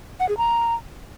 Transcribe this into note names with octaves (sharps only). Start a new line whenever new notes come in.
F#5
G#4
A#5